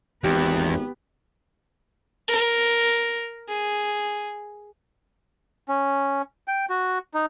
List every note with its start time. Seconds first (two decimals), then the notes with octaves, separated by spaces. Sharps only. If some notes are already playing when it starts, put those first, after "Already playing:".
0.24 G#1 E2 B3 G4
2.28 A#4
3.48 G#4
5.69 C#4
6.48 G5
6.70 F#4
7.14 D#4